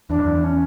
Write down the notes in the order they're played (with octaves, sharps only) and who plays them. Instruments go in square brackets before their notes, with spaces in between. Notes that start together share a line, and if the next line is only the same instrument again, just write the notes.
[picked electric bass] E2 [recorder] D4
[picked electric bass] F2
E2
[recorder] C#4